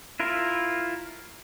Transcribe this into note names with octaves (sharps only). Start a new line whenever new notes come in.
E4 F4 A#4